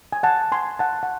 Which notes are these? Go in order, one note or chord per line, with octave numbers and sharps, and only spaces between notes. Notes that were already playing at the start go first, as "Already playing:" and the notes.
G#5
F#5 A5
G#5 C6
F#5 A5
F#5